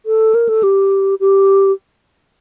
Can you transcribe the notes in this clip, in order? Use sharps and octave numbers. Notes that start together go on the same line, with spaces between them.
A4
A#4
A4
G4
G4